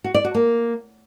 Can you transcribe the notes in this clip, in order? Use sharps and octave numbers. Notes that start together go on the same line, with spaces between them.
F#4
D5
F#4
A#3